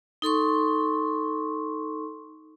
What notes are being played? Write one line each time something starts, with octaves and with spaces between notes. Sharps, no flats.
D#4 A4 C6 C#6